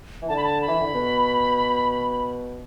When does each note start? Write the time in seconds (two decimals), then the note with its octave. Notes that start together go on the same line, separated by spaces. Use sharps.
0.22 E3
0.29 D3 A5
0.37 B5
0.44 A5
0.61 B5
0.68 E3
0.81 D3
0.94 B2